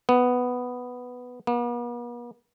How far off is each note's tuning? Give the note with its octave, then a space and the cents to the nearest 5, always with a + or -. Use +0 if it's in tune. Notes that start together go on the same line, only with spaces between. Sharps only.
B3 +5
B3 -45